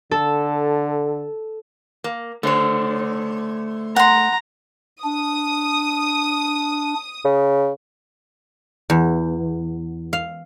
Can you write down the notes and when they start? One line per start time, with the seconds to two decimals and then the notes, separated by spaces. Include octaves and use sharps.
0.11 D3 A4
2.04 A#3
2.43 D3 A3 C5 C#5
3.96 F#5 A#5 C6
5.04 D4 D#6
7.25 C#3
8.90 E2
10.13 F5